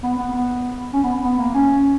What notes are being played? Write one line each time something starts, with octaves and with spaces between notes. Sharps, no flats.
B3
B3
B3
C#4
B3
B3
A#3
C#4